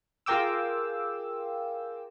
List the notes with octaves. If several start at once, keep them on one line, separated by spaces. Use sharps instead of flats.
F4 G#4 A#4 G5 D6 E6